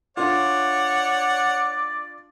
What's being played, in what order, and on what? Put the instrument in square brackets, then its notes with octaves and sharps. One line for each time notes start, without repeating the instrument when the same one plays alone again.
[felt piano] D4 F4 [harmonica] C#5 F#5 [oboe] D5